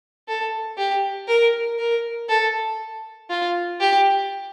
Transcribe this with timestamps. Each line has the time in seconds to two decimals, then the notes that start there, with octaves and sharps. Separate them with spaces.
0.28 A4
0.78 G4
1.28 A#4
1.79 A#4
2.29 A4
3.30 F4
3.80 G4